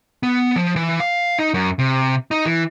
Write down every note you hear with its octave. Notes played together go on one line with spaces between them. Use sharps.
B3
F3
E3
F5
D#4
F#2
C3
D#4
E3